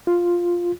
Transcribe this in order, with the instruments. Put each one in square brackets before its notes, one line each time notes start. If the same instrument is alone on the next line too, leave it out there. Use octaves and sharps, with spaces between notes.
[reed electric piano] F4